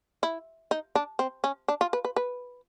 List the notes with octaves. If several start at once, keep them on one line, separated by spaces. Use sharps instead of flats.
E4
D#4
D4
C4
C#4
D4
F4
B4
B4
B4